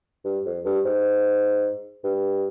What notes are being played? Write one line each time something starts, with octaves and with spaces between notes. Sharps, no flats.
G2
F2
G2
G#2
G2